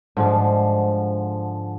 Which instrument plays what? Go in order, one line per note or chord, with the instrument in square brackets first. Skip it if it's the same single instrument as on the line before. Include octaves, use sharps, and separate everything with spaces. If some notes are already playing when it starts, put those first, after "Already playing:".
[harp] G#2 [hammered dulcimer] D3 F3 G#3